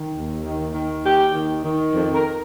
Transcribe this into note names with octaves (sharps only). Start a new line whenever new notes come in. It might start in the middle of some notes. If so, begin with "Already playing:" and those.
Already playing: D#3
D#2
D#3
D#3
D#2 G4
D#3
D#3
F2
A#4